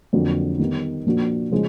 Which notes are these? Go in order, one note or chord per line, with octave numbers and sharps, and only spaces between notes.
F2 D3 F#3 A#3
D#3 G3 B3
A#2 F3 A#3 D4 F#4
C#3 F3 G#3